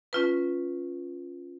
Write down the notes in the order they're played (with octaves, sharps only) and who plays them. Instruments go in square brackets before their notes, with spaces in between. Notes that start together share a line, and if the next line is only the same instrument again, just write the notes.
[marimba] C#4 F4 B4